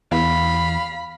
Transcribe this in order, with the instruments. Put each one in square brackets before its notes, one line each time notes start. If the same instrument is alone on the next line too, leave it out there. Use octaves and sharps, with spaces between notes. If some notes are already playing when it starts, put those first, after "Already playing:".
[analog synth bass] E2 [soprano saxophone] F5 [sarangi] B5